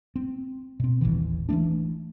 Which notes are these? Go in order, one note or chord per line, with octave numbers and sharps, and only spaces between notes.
C4
B2 C4
D#1 A1 D#3 E3
E3 F#3 A3 D4